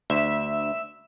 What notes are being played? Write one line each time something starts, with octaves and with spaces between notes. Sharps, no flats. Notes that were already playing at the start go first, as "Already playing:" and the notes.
D2 E5 E7